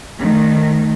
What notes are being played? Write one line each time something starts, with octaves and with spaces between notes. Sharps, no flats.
D#3 A3